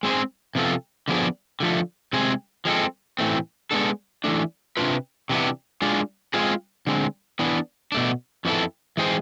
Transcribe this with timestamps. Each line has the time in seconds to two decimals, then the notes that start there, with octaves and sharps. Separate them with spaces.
0.03 G#3 C4 G#4 C5
0.55 C3 F3 B3 F4 A4
1.08 D3 F3 B3 D4 G#4
1.60 D3 F3 A3
2.13 C3 G#3 C4 G#4
2.65 F3 G#3 C4 E4 A4
3.19 A2 E3 A3 C4
3.71 G#3 B3 D4 A4
4.24 E3 A3 D4
4.77 C3 G#3 D4 F4 B4
5.29 C3 E3 B3 D4
5.82 G#3 D4 F4
6.34 G#3 C4 F4 G#4
6.87 D3 G#3 C4
7.39 E3 B3 D4
7.92 B2 A3 D4
8.45 F2 E3 B3 E4 A4
8.97 E3 G#3 C4 G#4 C5